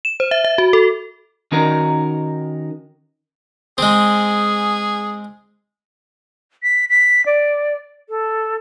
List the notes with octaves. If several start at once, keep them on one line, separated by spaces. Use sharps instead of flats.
E7
C5
E5
E5
F#4
A4
D#3 C#4 D#4 F#4 A#4
G#3 C4 G#4
B6
B6
D5
A4